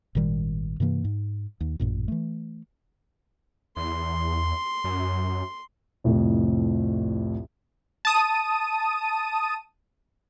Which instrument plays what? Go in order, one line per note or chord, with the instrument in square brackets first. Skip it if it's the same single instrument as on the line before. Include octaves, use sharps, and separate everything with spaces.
[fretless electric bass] G#1 A#2 D#3 G3
G2 C3 E3 A#3
G#2
D#2
A1 F#2 A#2
E3 A3
[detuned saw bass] E2 [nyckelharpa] C6
[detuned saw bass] F#2
[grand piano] C2 F2 A2
[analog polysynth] A5 D#6 D#7